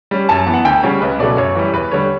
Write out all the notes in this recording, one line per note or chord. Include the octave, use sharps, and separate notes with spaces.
G3 C#4
F#2 A5
E3 B3
F#5
D2 G5
C#3 G3 C#4 C#5
C#2 B4
B2 F#3 A3 C#4 D5
F#2 C#5
E3 G3
E2 B4
D3 G3 C#5